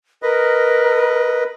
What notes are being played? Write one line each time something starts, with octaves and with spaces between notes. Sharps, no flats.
A#4 B4 D#5